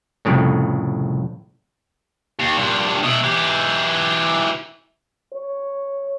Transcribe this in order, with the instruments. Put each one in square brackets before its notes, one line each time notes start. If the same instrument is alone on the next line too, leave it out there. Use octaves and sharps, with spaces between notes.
[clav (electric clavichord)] C2 F2 A2 C#3
[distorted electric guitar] D#2
G2 A#2
B2 E4
E3 G4
[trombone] C#5